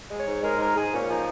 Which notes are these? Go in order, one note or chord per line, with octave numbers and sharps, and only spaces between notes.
G#3
C#5
G#2
G#3 A#4
G#2 A#4
G#2 G#4
A#2 C#4
F3 D#4